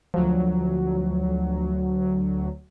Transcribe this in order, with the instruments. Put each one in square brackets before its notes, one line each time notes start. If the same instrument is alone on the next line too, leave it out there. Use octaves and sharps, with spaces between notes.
[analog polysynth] D2 F#3 [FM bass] F3